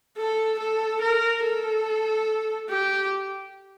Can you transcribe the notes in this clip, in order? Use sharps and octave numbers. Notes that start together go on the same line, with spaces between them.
A4
A4
A#4
A4
G4